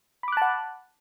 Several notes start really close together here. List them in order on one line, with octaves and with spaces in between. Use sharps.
B5 D6 F#6 A5 F#5